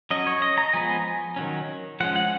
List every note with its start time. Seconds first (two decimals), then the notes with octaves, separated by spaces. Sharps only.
0.11 F#3 C#4 D#5
0.27 C#5
0.42 D#5
0.58 A#5
0.73 F3 G#3 B3 G#5
1.36 D#3 F#3 C#4
2.00 F3 G#3 C#4 F#5
2.16 F#5